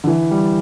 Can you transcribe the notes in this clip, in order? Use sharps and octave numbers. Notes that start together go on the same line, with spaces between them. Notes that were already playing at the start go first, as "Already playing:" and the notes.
D3
E3
G3